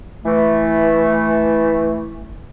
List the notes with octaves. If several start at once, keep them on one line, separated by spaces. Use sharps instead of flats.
E3 A3